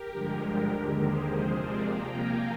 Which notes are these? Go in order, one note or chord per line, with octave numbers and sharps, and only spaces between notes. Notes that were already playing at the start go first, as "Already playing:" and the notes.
Already playing: G4 A#4
G2 D3 F3 G#3
G4 A#4
D#2 D3 G#3 G4 A#4
G#4 C5
C3 F3 G#3
A#4 D5
C3 F3 A#3 G5 A#5
F5 G#5